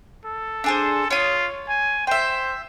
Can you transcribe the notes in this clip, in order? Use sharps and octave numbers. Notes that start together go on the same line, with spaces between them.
A4
D4 G#4 C5
F4 C#5 D#6
G#5
C5 E5 G5